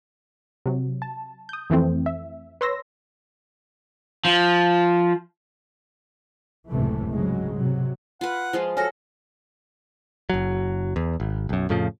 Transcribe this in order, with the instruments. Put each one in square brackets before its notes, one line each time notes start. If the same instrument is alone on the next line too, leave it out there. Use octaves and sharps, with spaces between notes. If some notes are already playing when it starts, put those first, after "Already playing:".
[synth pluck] C3 F#3
A5
D#6 G6
F2 E3 A3 C4
E5
B4 C#5 C6 E6 A#6
[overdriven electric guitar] F3
[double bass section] F#1 C#2 A2 C3 E3 A3
F1 G#2 C#3 F#3 G#3
C3 F#3
[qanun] F4 B4 [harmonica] F#5
[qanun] F3 G#3 F4
[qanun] F#4 A4 [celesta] C#5 G#5 A#6 [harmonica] F6
[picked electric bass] F#1 F#3
E2
G#1
B1 F#2
F2 A2 C#3 F3